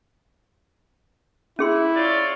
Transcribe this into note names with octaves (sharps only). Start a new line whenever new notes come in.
C#4 E4 G#4 C6
F4 C#5 D5